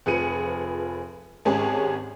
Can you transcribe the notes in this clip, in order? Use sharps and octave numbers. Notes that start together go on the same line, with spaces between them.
F1 F3 G#4 B4 C#7 D#7
G#1 G#3 C#4 G4 G#4 A5